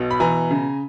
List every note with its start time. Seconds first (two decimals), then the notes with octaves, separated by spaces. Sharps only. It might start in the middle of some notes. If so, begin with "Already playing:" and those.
Already playing: B1 B2
0.11 B5
0.20 E3 G#5 A#5
0.51 C#3